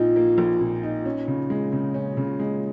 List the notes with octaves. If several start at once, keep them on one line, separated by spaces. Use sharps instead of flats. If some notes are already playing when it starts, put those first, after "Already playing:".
Already playing: A#1 A#2 A#3 D#4
A#3
A#1
A#2
D#4
C#4
C#3
G#3
C#3
C#4
C#3
G#3